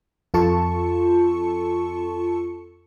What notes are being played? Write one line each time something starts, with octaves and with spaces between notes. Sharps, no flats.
F2 F4 A4 A5 C#6 C#7